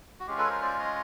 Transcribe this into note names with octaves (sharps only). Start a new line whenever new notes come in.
F#4
G#3 C#4 F4 G4
A4 B4
C#5
A#4 C5
C5 D5
C#5 D#5